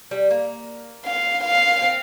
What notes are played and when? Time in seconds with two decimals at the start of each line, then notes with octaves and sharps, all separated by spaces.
0.11 G3
0.30 A#3
1.06 F5
1.44 F5
1.82 C4